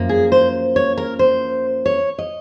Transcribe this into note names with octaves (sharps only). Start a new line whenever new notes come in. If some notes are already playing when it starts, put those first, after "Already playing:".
Already playing: F#2 F3 A#3
G#4
C5
C#5
A#4
C5
C#5
D#5